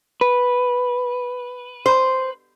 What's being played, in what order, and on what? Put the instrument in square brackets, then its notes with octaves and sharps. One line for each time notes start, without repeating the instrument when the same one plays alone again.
[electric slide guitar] B4
[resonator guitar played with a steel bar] C5